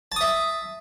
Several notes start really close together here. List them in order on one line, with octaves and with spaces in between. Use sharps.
A5 D#6 E5